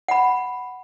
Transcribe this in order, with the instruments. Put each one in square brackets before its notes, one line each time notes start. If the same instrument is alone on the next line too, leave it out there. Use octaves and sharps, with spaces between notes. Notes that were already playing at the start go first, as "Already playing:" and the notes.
[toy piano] F#5 B5